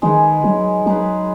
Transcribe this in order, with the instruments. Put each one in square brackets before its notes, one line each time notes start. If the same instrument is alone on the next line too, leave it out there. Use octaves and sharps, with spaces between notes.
[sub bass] D#3 [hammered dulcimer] G#3 D#4 G#4 B4
[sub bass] F#3
[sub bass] F#3 [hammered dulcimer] G#3 D#4 G#4 B4